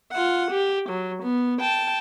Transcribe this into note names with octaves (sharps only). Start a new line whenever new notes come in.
F4 F#5
G4
F#3
B3
G5 A5